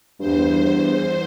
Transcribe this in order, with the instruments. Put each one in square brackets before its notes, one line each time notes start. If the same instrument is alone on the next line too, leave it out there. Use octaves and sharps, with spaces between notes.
[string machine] E2 C5 [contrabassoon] G2